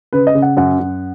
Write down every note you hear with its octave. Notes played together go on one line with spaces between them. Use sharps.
C#3 B4
D#5
C#3
F#5
F#2 F#5
F#2